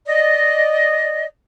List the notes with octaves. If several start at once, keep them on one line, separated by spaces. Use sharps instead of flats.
D5 D#5